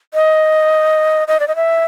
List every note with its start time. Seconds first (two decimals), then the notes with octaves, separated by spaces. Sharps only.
0.14 D#5
1.28 D#5
1.40 D5
1.48 D#5
1.56 E5